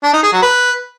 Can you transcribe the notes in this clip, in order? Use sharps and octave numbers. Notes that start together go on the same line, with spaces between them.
D4
D#4
G#4
F#3
B4